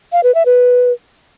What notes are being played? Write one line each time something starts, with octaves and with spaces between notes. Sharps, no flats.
F5
B4
E5
B4